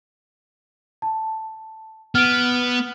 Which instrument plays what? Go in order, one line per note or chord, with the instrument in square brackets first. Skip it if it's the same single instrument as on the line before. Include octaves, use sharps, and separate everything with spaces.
[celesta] A5
[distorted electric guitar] B3 [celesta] F6 D7